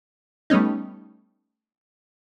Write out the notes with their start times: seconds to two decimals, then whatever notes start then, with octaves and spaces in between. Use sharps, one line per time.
0.50 G3 A3 B3 C#4 D#4